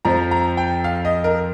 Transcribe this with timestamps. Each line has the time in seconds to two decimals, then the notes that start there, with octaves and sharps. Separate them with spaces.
0.05 F2 F3 C4 A#5
0.31 A#5
0.57 G5
0.84 F5
1.05 D#5
1.24 A#4